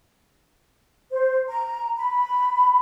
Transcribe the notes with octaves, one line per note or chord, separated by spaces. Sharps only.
C5
A#5
B5